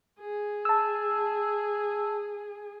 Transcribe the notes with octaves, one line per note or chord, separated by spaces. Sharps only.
G#4
A5 E6